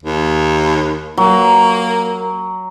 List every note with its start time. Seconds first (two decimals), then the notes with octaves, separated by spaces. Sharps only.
0.03 D#2
1.17 F#3 A#3